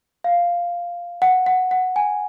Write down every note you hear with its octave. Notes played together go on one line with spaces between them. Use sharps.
F5
F#5
F#5
F#5
G#5